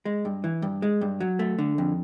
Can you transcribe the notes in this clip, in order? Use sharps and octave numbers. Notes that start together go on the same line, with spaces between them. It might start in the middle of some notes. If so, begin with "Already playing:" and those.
G#3
G2
E3
G2
G#3
G2
F#3
A3
D3
F2